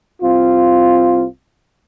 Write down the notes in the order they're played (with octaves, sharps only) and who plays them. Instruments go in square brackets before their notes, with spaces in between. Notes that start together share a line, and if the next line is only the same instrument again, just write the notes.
[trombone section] C2 C4 F4